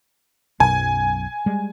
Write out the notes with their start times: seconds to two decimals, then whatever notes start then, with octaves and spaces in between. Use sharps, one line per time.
0.60 B1 F#2 B2 G#5
1.46 G3 G#3